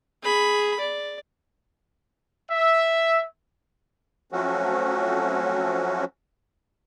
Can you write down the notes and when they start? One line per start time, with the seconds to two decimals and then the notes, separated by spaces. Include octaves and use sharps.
0.23 G#4 B5
0.80 D5
2.49 E5
4.32 F3 F#3 A3 C4 C#4 F#4